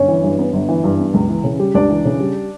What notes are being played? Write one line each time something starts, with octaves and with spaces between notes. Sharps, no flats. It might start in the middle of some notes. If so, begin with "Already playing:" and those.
Already playing: G1 C#4 C#5
E3
G2
B3
G1
E3
G2
B3
C#2
E3
C#3
G3
C#2 D4 D5
E3
C#3
G3